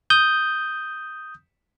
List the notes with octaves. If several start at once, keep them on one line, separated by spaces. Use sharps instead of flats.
D#6 G6